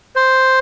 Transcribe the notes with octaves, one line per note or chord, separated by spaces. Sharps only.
C5